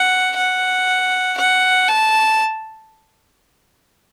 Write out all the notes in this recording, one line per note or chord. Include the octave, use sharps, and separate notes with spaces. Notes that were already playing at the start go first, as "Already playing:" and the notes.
Already playing: F#5
F#5
F#5
A5